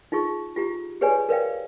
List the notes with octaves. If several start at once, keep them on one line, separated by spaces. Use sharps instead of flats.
D#4 F4 G#4 C#6
F4 G4 A#5
G4 G#4 B4 C#5 D5 G#5
A#4 B4 D5 F5 G5